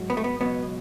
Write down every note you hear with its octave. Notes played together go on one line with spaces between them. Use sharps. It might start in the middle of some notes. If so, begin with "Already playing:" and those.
Already playing: G#2 F#3
B3
A3
B3
C#2 B2 F#3 B3